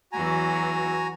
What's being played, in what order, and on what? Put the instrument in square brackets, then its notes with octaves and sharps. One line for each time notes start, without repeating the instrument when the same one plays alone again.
[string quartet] E2 E3 F#3 [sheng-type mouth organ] F#4 G#5 A#5